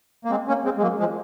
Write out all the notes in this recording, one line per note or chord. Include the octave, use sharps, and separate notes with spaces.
A#3
G#3 C4
A#3 C#4
G#3 C4
G#3
F#3 A#3
F3 G#3